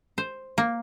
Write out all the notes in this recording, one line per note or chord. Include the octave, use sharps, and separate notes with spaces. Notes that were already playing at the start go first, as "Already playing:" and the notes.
C5
A#3